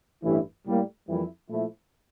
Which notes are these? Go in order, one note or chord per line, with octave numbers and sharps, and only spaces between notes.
A1 G2 E3 A3 E4
A2 G3 A#3
F2 E3 G3 A#3 E4
A#2 F3 A3 E4